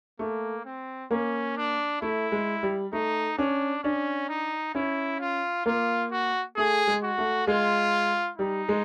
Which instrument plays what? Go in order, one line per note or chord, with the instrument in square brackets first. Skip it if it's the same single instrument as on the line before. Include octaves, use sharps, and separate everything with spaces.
[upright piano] A3 [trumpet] A#3
[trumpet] C4
[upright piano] A#3 [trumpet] C#4
[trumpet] D4
[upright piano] A3 [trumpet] E4
[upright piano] G#3
G3
[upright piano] A3 [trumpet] D#4
[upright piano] C#4 [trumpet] D4
[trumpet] C#4 [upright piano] D4
[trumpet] D#4
[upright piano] C#4 [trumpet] E4
[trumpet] F4
[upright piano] A#3 [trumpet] F4
[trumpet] F#4
[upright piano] A3 [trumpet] G#4
[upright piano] G#3
[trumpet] F#4
[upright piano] A3
[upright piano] G#3 [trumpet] F4
[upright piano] G3 [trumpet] D#4
[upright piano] G#3